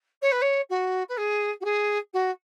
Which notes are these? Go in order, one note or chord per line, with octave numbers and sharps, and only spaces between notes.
C#5
B4
C#5
F#4
B4
G#4
F#4
G#4
F#4